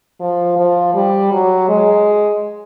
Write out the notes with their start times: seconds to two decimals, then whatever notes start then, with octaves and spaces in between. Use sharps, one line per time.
0.20 F3
0.57 F3
0.94 G3
1.32 F#3
1.69 G#3